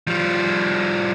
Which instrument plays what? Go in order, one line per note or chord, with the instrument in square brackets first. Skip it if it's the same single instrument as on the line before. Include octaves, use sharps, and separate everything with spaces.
[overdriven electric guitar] F3 G3